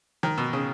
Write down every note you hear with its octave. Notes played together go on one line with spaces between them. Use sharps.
D#3
B2
C#3